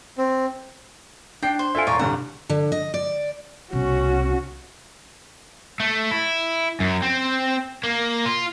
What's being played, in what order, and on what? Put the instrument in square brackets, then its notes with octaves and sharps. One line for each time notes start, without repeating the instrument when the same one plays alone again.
[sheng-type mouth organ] C4
[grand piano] D4 C7 [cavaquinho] G5
[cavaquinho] C5
[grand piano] F4 A4 E5 [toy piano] D5 G#5
[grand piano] E1 C6 [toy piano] A4 F5 A#5 [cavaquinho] C#5 D5
[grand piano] C2 G2 D3 [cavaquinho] F#5 [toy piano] A#5
[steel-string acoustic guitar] D3
D#5
D5
[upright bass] C2 B2 [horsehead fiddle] C#4 F#4
[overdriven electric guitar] A3
E4
F#2
C4
A#3
F4